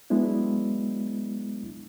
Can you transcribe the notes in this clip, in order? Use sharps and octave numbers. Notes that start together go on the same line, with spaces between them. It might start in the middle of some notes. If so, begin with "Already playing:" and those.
F#3 G#3 B3 D4 E4